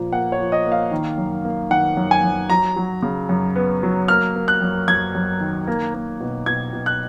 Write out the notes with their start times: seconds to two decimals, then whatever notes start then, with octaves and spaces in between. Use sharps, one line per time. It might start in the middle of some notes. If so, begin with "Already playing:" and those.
Already playing: A#2 F3 A#3
0.12 A#3 F#5
0.32 C#5
0.38 F3
0.52 D#5
0.66 A#3
0.72 F5
0.91 D#3
1.18 F#2
1.44 A#3
1.70 D#3 F#5
1.97 F#2
2.11 G#5
2.24 F#2
2.50 F#3 A#5
2.76 F#3
3.02 C#3
3.29 F#2
3.56 B3
3.83 F#3
4.08 A#3 F6
4.35 A#3
4.48 F#6
4.62 F#2
4.88 F#2 G#6
5.15 F#2
5.41 D#3
5.67 A#3
5.94 A#3
6.20 B2
6.46 B2 G#6
6.73 B2
6.86 F#6